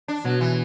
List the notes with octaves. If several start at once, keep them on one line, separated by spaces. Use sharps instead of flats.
D4
B2 F#3
E3